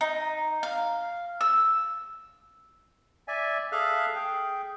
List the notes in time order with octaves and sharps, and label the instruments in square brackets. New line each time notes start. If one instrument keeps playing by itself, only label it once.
[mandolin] D#4
F5
E6
[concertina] D5 E5 G#5
G#4 A4 E5 F5 F6 F#6
G#4 G5